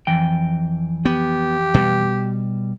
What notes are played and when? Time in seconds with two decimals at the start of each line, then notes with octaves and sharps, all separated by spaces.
0.07 F2 E3 G5
1.05 B3 G4
1.74 B2 G3